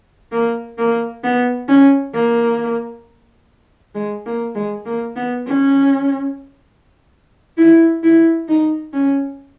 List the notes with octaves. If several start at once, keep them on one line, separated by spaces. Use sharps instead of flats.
A#3
A#3
B3
C#4
A#3
G#3
A#3
G#3
A#3
B3
C#4
E4
E4
D#4
C#4